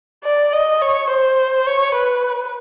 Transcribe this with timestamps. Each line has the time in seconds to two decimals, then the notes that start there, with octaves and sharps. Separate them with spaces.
0.24 D5
0.53 D#5
0.81 C#5
1.10 C5
1.67 C#5
1.94 B4